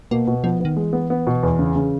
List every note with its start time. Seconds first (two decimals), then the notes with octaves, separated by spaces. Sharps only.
0.11 B2 A#3
0.27 B2
0.44 F3 B3
0.60 D#3 B3
0.77 E3 G#3
0.93 B3
1.10 B3
1.27 B2
1.43 E2
1.59 C#3
1.76 C#3